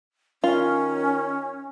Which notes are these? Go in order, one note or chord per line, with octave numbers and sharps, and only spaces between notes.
D#3 C#4 F4